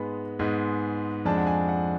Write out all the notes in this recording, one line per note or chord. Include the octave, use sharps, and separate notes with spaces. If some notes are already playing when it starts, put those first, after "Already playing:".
Already playing: G#2 G#3 B3 B5
G#2 G#3 B3
F2 F3 G#3 D4 A5
F#5
G#5
F#5